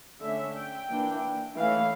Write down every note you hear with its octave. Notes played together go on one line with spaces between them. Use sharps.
D3 A3 C#4 E5
G5
E3 A#3 D4
E3 A3 C#4 F5